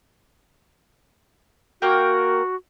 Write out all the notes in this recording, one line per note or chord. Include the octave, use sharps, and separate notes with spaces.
A#3 F#4 A#4 G5